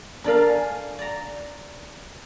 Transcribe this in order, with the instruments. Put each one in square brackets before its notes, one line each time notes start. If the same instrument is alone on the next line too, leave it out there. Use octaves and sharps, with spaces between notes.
[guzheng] D4 A4 F5 [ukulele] A#4 D5 A#5
[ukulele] G#5
[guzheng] D5 A#5